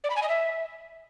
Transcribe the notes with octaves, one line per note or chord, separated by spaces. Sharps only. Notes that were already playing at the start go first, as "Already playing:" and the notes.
D5
B5
G#5
D#5
E5